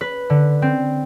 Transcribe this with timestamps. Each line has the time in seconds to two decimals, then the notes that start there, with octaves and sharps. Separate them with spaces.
0.01 B4
0.30 D3
0.62 C4